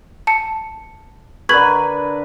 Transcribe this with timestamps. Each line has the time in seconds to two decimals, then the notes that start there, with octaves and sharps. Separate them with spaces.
0.27 A5 C#7
1.49 D3 A#4 B4 C#6 G#6 F#7